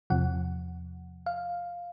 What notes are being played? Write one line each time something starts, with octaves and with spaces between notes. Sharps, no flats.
E2 C3 F3 F#5
F5